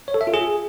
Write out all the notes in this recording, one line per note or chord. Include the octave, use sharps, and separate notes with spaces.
C#5
A4
E5
F4
G#4